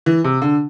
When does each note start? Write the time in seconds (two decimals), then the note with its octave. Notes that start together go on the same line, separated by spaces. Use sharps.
0.06 E3
0.24 C3
0.42 D3